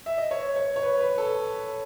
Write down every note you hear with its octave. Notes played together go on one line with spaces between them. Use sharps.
E5
D#5
C#5
C#5
C#5
B4
B4
A4